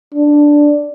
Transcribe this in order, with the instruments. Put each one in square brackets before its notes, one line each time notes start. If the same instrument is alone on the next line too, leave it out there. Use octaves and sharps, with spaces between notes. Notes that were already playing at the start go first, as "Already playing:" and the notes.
[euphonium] D4